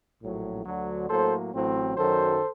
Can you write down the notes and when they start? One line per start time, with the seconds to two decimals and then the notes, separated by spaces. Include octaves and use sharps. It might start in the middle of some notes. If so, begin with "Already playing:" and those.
0.21 A#1 A2 F#3
0.66 D2 D3 F#3
1.09 A2 F#3 A#3 A4 C5
1.53 A1 A2 F#3 C4
1.96 F#2 D#3 F#3 A4 C5